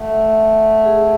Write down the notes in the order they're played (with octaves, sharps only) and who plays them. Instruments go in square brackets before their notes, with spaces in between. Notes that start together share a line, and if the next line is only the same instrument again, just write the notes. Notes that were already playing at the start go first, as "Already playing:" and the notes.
Already playing: [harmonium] A3 [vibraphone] F#5
[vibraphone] F#5
G#4